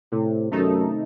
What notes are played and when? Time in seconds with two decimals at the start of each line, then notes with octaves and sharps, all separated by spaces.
0.12 A2 C3
0.51 F#2 D#3 A3 D#4 A4